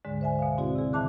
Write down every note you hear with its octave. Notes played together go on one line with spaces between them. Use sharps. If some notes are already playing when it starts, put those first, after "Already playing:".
D2 G#2 D3 G#3
C5 E5 G#5
B2 F5
C4 E4 F#4 G#4 D5
C3 G#4
D#3 E5 A5 D6 F#6